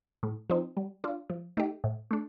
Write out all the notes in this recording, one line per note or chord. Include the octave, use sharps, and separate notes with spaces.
A2
F3 C4 D#4
G3
D4 F4
F3
A3 D#4 G4
A2
A3 D4